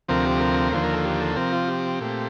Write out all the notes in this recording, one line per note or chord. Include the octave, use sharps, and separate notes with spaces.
D2 C3 F3 C4 A#4
G4
A#4
D#2 D3 F3 A#3 C5
A#4
A4
G4
A4
C3 F3 C4 A#4
F4
G4
A#2 A3 C4